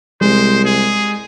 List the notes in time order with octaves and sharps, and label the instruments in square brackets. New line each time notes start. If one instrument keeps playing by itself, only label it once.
[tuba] C2 [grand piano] G#3 [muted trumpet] C5
[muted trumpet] G#4